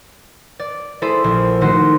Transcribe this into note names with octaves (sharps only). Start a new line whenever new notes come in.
D5
A3 E4 G#4 A4 C5
A#1
D#3 A3 D#4 F#4 C5